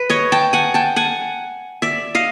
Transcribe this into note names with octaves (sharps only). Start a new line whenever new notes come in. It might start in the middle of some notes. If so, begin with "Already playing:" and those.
Already playing: B4
C#5 D#5
G5 A5
F#5 G#5
G5 A5
F#5 G#5
D5 E5
D#5 F5